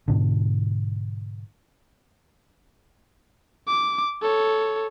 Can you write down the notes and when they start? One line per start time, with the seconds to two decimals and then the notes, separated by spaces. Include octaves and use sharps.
0.08 G#2 B2 D3
3.68 D6
4.22 A4 C#5